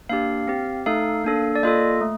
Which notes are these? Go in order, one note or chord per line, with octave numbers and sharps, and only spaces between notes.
A#3 D4 G4 F5
C4 G4
A3 D#4 A4 F5
A#3 D4 A4
D5
A#3 F4 A4 D#5
A3